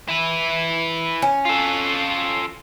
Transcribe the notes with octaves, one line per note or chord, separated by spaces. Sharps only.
E4 B4
C#4
F4 A4